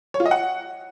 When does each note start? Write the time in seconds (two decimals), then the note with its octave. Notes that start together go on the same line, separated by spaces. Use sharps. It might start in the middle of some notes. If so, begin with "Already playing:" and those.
0.14 C#5
0.20 F4
0.26 D#5
0.31 F#5